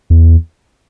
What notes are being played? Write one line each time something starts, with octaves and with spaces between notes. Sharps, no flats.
E2